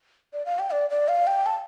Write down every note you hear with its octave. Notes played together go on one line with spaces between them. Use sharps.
D5
F5
G5
D5
D5
F5
G5
A5